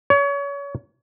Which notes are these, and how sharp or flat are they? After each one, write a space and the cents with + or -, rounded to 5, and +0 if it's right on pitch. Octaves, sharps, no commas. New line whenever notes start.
C#5 +30